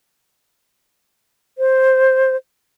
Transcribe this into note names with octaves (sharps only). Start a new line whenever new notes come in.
C5